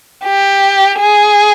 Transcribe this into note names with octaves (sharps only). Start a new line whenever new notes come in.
G4
G#4